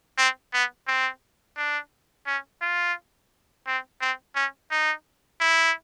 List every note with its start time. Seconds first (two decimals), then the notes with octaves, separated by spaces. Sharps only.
0.18 C4
0.53 B3
0.88 C4
1.57 D4
2.27 C#4
2.61 F4
3.67 C4
4.01 C4
4.36 C#4
4.71 D#4
5.41 E4